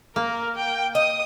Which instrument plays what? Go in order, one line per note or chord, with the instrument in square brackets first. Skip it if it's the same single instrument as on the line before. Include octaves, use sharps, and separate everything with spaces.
[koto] A#3 [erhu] A#4
[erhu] G5
[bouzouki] D#5 [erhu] D#6